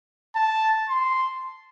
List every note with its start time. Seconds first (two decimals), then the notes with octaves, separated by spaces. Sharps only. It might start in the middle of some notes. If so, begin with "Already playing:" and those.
0.36 A5
0.89 C6